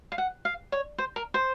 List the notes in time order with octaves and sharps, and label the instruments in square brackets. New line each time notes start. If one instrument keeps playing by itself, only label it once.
[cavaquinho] F5
F#5
F5
C#5
C5
A#4
C5